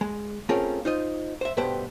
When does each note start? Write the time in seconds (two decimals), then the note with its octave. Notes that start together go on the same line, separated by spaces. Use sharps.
0.01 G#3
0.49 A3 C4 C#4 F4 G#4 A#4
0.85 D#4 F4 C5 D#5
1.41 C5 E5
1.57 G2 B2 A3 G4 B4 C5